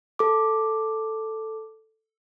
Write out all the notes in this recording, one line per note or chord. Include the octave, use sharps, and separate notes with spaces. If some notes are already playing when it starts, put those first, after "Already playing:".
A4 D6